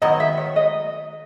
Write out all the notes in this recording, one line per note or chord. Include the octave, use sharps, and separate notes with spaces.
D#3 F#3 B3 E4 D#5
E5
C#5
D#5